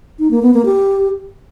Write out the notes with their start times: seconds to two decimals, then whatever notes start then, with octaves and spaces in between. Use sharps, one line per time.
0.19 D#4
0.31 A#3
0.42 B3
0.54 A#3
0.65 G4